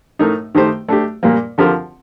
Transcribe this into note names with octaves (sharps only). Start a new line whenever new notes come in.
A2 A3 D#4 A#4
D#3 A3 D#4 G4 C5
A3 D4 G4
A#2 G3 A#3
D3 F3 C4 G4 A#4